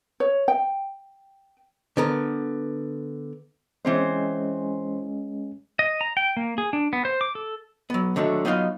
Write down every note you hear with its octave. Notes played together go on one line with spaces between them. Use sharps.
C#5
G5
D3 B3 A#4
E3 G#3 C4 C#4 C5
D#5
A#5
G5
A#3
G#4
D4
B3
C5
D6
A4
F#3 B3
D3 D#3 F#3 A3
F#3 B3 D#4 F4 D#5 F5